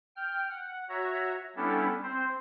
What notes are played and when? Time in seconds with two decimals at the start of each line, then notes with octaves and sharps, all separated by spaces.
0.16 G5 F6
0.50 F#5
0.89 F#4 C#5 E5 A#5
1.56 G3 B3 C#4 D4 E4 A4
2.03 C4 C5